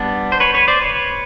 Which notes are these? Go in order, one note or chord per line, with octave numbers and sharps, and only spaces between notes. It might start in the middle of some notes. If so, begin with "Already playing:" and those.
Already playing: G3 B3 D4
C5
B4 C#5
B4 C#5
C5 D5
B4 C#5